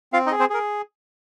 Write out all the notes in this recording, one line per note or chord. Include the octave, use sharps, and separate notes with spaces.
C4 F4 F5
D#4 D#5
G#4
C4 C5
G#4 A#4